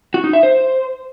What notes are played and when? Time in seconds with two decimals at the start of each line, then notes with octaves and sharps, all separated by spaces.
0.14 F#4
0.24 D#4
0.33 E5
0.43 C5